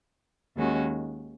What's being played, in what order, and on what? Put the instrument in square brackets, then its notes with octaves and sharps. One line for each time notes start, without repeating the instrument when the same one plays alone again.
[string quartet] D#2 D#3 G#3 C#4 F#4